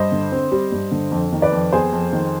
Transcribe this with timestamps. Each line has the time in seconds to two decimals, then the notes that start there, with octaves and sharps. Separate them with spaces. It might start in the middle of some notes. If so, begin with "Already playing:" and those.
Already playing: G2 C5 D#5
0.12 D3
0.32 C4
0.52 G3
0.72 G2
0.92 D3
1.12 F2
1.33 D#3
1.42 B4 D5
1.52 F2
1.72 B3 G#4 C5
1.93 F2
2.13 D#3